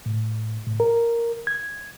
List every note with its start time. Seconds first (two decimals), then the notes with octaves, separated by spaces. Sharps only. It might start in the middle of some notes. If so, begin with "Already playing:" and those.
0.06 A2
0.66 A2
0.80 A#4
1.47 G#6